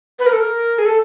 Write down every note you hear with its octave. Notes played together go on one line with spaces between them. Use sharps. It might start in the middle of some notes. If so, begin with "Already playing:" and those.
B4
A#4
A4
A#4
G#4
A4